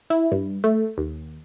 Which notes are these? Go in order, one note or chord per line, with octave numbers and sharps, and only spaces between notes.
E4
G2
A3
D#2